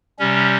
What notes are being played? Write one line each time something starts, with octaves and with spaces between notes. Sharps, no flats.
C3 G3 C#4